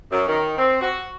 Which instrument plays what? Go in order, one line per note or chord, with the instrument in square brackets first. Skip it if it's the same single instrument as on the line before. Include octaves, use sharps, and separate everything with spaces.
[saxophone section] F#2
D#3
C4
F#4